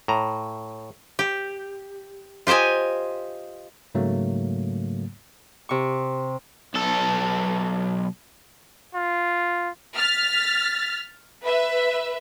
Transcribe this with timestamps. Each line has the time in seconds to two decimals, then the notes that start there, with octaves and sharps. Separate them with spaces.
0.08 A2 A#5
1.19 G4
2.47 F4 G4 C5 D#5 G#5
3.95 G#2 C#3 F#3 A3 A#3
5.69 C3 C#6
6.74 B1 A4
8.95 F4
9.96 F6 A6 B6
11.42 B4 E5